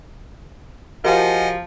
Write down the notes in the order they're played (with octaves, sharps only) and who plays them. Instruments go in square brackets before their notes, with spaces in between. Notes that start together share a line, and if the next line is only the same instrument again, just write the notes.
[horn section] F3 [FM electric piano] F#4 G4 A#4 [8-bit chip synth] D#5 F#5 G#5